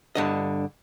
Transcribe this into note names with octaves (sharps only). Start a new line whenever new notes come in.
G2 D3 D#5